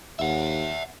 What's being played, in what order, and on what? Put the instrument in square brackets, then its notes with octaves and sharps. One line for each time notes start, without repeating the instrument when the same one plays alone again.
[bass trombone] D#2 [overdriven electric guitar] E5 F#5